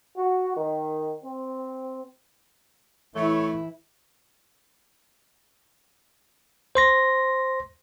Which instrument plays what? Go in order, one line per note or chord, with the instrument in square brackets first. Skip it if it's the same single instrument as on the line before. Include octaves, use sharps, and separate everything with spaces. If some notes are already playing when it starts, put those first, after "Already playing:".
[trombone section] F#4
D#3
C4
[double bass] E3 E4 [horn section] A3 [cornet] C#5
[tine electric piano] C5 C6 A#6